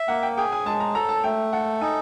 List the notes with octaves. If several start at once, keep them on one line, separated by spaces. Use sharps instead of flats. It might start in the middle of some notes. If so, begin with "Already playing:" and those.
Already playing: E5
A#3 F#5
G5
G#4 G5
G#5
G#3 A5
A#5
A4 A#5
A5
A3 G5
A4 F#5
D#4 G#5